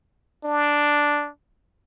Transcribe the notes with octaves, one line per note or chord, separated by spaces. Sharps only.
D4